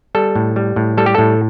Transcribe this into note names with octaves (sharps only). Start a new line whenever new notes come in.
G3 A4
A2
G3
A2
G3 A4
G4
A2 A4